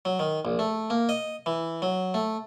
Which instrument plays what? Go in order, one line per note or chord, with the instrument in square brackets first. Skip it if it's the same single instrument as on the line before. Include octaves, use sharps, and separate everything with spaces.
[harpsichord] F#3
D#3
A#1
A3
A#3
D#5
E3
F#3
A3